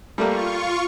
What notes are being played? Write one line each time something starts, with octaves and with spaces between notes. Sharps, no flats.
G3 A3 A#3 F4 C#6